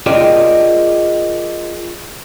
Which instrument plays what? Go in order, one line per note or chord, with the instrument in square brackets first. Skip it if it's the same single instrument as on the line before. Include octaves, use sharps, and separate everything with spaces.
[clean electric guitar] F4 G#4 A#4 D5 D#5 G5